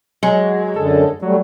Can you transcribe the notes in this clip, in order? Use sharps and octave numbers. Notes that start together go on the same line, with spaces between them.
F#3 G#3
F#2 D3 A4
F#3 G3 A3